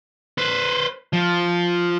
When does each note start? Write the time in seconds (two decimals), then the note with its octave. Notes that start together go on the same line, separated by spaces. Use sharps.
0.38 B4 C5
1.13 F3